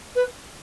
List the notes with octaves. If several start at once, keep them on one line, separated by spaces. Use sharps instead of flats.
B4